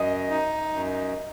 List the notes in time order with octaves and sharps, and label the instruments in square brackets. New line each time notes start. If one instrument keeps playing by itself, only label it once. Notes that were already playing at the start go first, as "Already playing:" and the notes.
Already playing: [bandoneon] F#2 [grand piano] D#5
[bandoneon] D#4
F#2